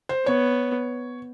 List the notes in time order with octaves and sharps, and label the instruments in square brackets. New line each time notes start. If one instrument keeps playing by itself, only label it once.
[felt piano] C5
[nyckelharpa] B3 [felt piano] C#5